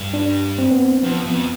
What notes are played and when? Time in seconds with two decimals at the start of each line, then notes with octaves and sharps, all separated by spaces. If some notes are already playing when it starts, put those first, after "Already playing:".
Already playing: G2
0.14 D4
0.58 C4
0.71 B3
0.83 C4
1.03 F2 B3
1.26 F2 B3